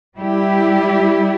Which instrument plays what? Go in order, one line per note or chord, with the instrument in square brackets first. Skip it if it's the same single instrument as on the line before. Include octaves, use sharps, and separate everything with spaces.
[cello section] G3 E4 G4